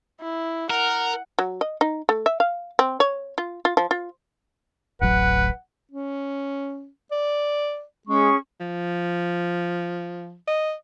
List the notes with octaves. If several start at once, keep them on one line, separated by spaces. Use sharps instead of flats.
E4
A#4 F#5
F#3
D#5
D#4
A3
E5
F5
C4
C#5
F4
F4
F3
F4
D1 A1 F#3 B4 F#5
C#4
D5
G#3 C#4 G#4 C#6
F3
D#5